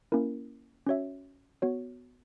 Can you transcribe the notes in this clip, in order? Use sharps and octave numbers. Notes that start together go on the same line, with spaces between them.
A#3 C#4 E4 A#4
C#4 F#4 C#5 E5
B3 F#4 C#5